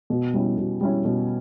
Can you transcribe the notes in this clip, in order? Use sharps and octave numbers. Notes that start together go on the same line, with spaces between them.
B2
G3 C#4 E4
B2
G3 C#4 E4
B2